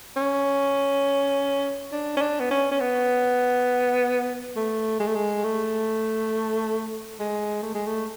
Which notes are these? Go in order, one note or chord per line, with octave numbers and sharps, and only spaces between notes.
C#4
D4
C#4
D4
B3
C#4
C#4
B3
A3
G#3
A3
G#3
A3
G#3
A3
G#3
A3